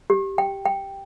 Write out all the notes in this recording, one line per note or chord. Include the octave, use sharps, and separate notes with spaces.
G4
G5
G5